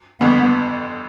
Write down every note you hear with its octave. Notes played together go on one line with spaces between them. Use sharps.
G1 F2 D3 B3